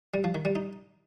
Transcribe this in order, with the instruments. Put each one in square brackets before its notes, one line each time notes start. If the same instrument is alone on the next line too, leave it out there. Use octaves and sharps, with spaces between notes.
[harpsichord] G3
F3
D#3
G3
D#4